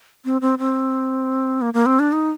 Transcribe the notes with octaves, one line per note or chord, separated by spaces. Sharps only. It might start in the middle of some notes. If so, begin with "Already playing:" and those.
C4
C4
C4
A#3
A#3
C4
D4
D#4